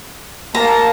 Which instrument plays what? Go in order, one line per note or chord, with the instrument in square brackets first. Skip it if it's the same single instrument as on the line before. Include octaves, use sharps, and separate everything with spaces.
[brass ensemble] A#3 F5 A5 [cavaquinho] A#5